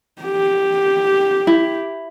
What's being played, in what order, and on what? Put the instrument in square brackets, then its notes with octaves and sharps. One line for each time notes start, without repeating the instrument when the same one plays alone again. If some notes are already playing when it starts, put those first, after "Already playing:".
[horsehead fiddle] G4
[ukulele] E4